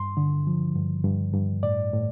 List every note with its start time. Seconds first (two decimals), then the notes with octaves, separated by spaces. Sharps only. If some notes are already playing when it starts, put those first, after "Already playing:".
Already playing: G2 C6
0.17 D3
0.47 F3
0.76 G2
1.04 G2
1.34 G2
1.63 A2 D5
1.93 A2